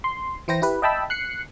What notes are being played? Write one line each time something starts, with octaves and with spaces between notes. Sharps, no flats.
C6
E3 E4 C5 G5 A#6
E4 G4 B4
D#5 E5 G5 A5 B5 E6
F#6 C7 C#7